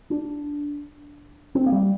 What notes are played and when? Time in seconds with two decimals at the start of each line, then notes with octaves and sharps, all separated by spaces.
0.10 D4
1.55 C4
1.66 A#3
1.72 G3